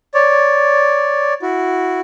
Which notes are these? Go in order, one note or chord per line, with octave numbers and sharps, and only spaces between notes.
C#5 D5
E4 F#4